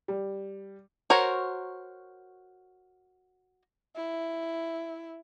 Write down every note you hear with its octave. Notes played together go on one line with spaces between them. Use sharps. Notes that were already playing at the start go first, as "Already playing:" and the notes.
G3
F#4 A#4 C5 C#5
E4